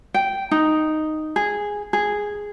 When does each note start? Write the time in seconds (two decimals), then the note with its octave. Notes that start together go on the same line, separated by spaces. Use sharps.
0.14 G5
0.51 D#4
1.36 G#4
1.93 G#4